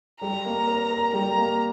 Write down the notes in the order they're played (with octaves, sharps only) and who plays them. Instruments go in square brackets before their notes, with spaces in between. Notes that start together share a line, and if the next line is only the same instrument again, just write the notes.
[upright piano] G3 [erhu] A#5
[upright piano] A#3
A#4
A#4
[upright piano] G3 [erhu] A#5
[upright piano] A#3